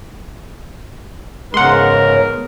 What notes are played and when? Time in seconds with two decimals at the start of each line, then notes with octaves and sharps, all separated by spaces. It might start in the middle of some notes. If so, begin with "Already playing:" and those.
1.54 G#2 C#3 G#3 B3 A#4 F#5 C6